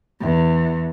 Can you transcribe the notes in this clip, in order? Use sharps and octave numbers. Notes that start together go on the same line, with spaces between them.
E2